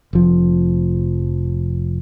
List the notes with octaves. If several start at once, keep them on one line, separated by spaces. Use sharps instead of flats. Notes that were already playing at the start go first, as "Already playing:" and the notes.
F1 F3